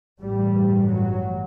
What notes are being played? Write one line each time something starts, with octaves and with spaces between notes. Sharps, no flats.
A1 G2 G3
F#3